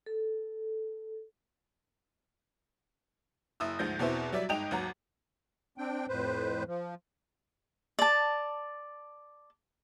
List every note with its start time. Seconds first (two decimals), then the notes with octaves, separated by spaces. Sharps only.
0.06 A4
3.60 F#1 E4 D#6 E6
3.79 D2 G#2 F3 G6 A#6
3.99 E2 B2 C4 E4 C5
4.33 F#3 G3 D5 E5
4.49 G1 G#2 D#4 D#5 G5 F7
4.71 G#1 D#2 F#3 F#5 A#5
5.78 C4 D4 G5
6.09 F2 A2 B4 C5
6.67 F3
7.99 D5 A5